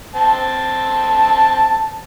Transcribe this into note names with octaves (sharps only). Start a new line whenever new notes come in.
C4 A5